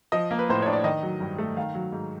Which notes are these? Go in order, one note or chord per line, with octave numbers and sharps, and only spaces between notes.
F3 D#5
A#3
B4
A2 C5
D4 C#5
D5
D#3 D#5
F#3
G2
A3
D#3 F5
F#3
G#2